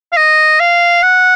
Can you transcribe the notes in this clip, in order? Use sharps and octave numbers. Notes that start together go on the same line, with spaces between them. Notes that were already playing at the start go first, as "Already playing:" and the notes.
F5
D#5
F5
F#5